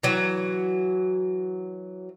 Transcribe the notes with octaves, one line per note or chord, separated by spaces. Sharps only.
E3 F#3